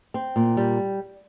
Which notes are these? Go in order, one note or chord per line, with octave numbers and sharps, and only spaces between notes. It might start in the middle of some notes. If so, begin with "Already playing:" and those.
C4
A#2
G3